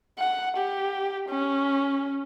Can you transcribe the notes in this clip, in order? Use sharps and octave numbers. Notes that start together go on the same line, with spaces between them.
F#5
G4
C#4